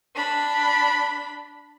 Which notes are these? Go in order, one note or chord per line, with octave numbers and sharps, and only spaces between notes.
D4 B5